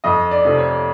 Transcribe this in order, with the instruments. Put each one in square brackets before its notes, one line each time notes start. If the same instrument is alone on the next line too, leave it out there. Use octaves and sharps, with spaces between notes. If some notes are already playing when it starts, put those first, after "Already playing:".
[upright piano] F2 D#5
D5
C3 F3 A3
C#5